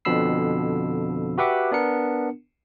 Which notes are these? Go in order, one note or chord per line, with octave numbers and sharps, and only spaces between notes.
F2 B2 D3 B5 E6 C7
F#4 G4 B4 E5 F#5 D6
B3 D4 A#4 C#7